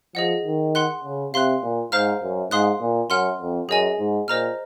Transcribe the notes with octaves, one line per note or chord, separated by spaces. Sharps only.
F3 G#4 D#5 F#5
D#3
F#5 C6 F#6
C#3
C3 F5 C6 F#6
A#2
G#2 C5 F5 A#5 F6
F#2
G#2 F5 C6 D#6 F#6
A#2
F#2 F#5 C6 F6
F2
F#2 G#4 D#5 G#5
G#2
A#2 C5 D#5 A#5 F6